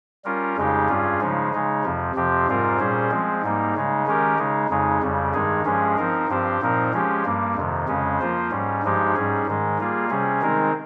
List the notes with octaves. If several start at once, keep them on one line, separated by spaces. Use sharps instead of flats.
G3 C#4 F4 A#4
F2 C#3 G#3 D#4 G4
G2 G3 C#4 F4 G#4
C#3 F3 G#3 D#4
C#3 G#3 D#4
F2 C3 F3
F2 C3 F3 C4 G4
G#2 G3 C4 F4 A#4
A#2 G3 C#4 G#4 C5
F3 G#3 C4
G#2 G3 A#3 D#4
C#3 G#3 D#4
D#3 G#3 C#4 G4 A#4
C#3 G#3 D#4
F2 C#3 G#3 D#4
F2 C#3 G3
G2 D#3 G#3 D#4 G#4
G2 F3 G#3 C#4 G#4
F3 C4 D#4 A#4
G2 F3 C4 G4 C5
A#2 F3 C4 D#4 A#4
F3 G#3 C#4 G4
G2 G3 A#3
F2 C3 D#3
F2 C#3 G#3 C#4
F3 A#3 F4 C5
G#2 G3 C#4
G2 F3 G#3 D#4 G4
G#2 G3 C#4 G#4
G#2 D#3 G#3
G3 A#3 F4 G#4
C3 G3 C#4 G#4
D#3 G#3 C4 D#4 A#4